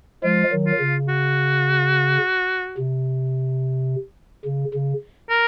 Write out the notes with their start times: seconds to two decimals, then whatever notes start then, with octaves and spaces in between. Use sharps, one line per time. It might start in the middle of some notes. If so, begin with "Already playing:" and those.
0.23 F3 G#3 F4
0.52 D#3 F#3
0.66 F4
0.80 C#3
1.08 F#4
2.77 C3
4.45 C#3
4.74 C#3
5.30 A#4